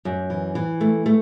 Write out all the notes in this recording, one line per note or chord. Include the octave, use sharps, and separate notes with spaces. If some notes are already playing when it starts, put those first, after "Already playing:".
F#2
E3
E3
A3
A3